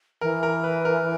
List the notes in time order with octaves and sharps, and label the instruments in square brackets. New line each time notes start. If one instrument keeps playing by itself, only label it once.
[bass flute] E3 [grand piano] A#4
[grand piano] A#4
B4
A#4